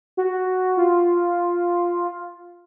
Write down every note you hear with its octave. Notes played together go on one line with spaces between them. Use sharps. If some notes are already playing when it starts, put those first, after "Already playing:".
F#4
F4